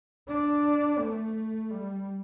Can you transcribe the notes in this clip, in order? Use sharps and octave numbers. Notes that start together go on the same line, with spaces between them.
D4
A3
G3